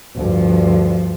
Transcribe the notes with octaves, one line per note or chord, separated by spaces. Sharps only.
D2 G2 F3